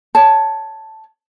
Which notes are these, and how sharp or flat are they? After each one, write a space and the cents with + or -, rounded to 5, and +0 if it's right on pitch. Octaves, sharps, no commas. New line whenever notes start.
C#5 +15 A5 +0